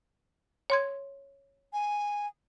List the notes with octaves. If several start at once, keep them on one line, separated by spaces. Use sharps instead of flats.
C#5 C6 G#6
G#5